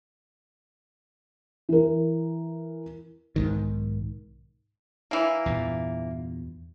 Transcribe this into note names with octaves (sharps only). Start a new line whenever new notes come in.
E3 A#4
B1 G#2 D#3
E3 A#3
E2 G2 A#2